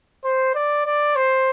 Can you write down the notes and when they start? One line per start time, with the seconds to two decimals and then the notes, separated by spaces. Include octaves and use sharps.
0.24 C5
0.55 D5
0.85 D5
1.16 C5